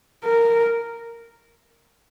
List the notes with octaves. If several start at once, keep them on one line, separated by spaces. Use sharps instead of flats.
A#4